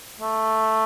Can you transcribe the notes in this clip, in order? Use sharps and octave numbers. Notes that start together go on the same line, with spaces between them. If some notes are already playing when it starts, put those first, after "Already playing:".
A3